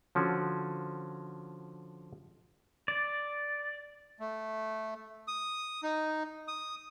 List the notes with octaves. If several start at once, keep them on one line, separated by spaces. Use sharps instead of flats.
D3 F3 C#4 F#4
D5
A3
D#6
D#4
D#6